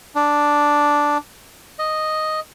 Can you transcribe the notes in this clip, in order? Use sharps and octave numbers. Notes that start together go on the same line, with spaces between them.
D4
D#5